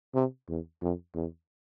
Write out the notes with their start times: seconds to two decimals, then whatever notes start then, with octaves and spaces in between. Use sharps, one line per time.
0.15 C3
0.49 E2
0.82 F2
1.15 E2